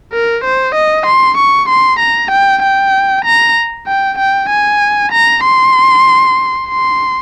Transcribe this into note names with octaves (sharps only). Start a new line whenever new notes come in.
A#4
C5
D#5
C6
C#6
C6
A#5
G5
G5
A#5
G5
G5
G#5
A#5
C6
C6